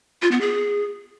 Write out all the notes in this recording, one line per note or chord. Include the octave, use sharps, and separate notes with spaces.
F4
B3
G#4